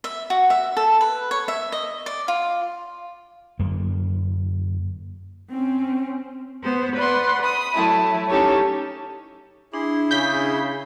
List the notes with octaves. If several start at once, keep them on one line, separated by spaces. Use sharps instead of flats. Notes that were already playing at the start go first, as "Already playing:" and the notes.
E5
F#4
E5
A4
B4
C#5
E5
D#5
D5
F4
F#2 D3 A#3
C4 C#4
B3 C5
B4 D5 F#5 B5 C6
B5 D#6
F#3 A3 E4
C#4 D#4 E4 G4 A4 C#5
D4 E4 G#4 C6
C#3 G6 B6